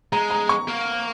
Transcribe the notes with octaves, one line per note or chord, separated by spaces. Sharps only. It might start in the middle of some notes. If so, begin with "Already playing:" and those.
G#3 A#5
A#5
C#6
A#3